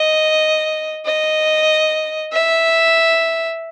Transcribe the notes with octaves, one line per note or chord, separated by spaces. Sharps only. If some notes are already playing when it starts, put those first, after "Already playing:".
Already playing: D#5
D#5
E5